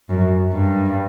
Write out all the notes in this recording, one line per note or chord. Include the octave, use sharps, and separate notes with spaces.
F#2
G2